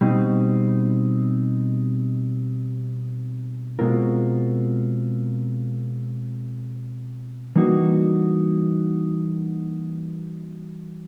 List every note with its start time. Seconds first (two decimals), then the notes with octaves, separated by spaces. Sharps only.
0.01 B2 G3 C4 D#4
3.79 B2 G#3 C4 F4 A#4
7.56 E3 G3 A#3 D#4 F#4